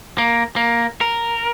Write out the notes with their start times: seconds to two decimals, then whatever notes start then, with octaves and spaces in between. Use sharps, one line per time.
0.18 A#3
0.56 A#3
1.01 A#4